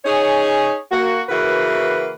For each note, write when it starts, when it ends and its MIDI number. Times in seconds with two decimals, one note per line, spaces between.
0.05 0.76 61
0.05 0.76 63
0.05 0.76 68
0.05 0.76 73
0.92 1.21 58
0.92 1.21 66
1.29 2.11 49
1.29 2.11 52
1.29 2.11 58
1.29 2.11 66
1.29 2.11 71